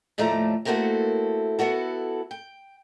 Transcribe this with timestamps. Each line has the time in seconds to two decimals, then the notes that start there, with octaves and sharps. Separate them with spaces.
0.18 D#2 A2 F3 A3 D5 A#5
0.65 A3 A#3 C4 E4 F#4 A4
1.59 B3 E4 F#4 A4
2.31 G5